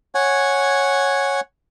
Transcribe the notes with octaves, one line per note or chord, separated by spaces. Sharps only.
C#5 F#5 G#5